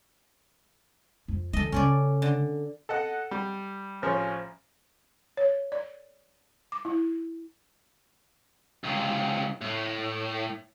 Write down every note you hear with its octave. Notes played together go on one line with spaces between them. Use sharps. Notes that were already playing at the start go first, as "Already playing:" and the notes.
F2
D3 F3 A4 D#5
C#3 A3 C#4 C#5 D5
D3
A4 D#5 F#5
G3
A1 F3 G#4 C#5
C#5
D5
D6
E4
C#2 C3
A2